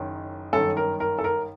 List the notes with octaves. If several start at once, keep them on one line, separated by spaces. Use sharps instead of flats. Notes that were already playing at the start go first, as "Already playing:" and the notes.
Already playing: F#1 F#2 D#3 F#3
G1 F#2 D#3 A4
A#4
A#4
A4
A#4